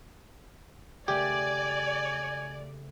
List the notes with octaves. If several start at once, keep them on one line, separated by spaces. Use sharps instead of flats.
C#3 A3 G4 D5 G#5